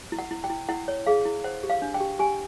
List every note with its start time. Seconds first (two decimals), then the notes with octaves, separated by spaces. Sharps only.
0.12 E4
0.19 F#5
0.31 E4
0.44 G5
0.50 E4
0.69 E4 F#5
0.88 C#5
1.06 G#4 F5
1.25 E4
1.44 C5 F#5
1.63 G4
1.70 F5
1.82 D4
1.94 G5
2.01 G4
2.19 G4 G#5